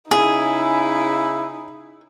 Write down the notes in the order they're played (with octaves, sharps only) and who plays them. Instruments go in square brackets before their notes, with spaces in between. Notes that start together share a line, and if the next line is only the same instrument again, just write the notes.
[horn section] C#3 E4 [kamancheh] D#4 [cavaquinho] G#4 [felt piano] G#5